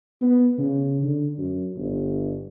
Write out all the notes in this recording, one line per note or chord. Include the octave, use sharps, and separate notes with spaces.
B3
C#3
D3
F#2
G1